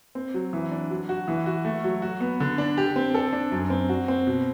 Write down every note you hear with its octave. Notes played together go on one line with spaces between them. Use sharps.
C4
F#3
E3
D4
F#3
F#4
E3
F#4
A3
F#3
F#4
B3
D3
D4
G4
C4
A4
D4
F#2
C4
F#4
C4
B2